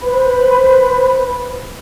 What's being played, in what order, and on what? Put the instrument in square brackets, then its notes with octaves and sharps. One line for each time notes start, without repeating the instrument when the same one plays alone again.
[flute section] B4 C5 B5